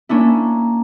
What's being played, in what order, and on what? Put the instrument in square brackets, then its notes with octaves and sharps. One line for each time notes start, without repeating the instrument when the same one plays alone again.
[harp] A#3 C#4 D4 E4